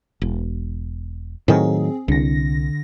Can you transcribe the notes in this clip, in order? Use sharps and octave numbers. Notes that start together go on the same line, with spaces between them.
E1
A2 D#3 F#3 C4 G#4
C2 D3 A#6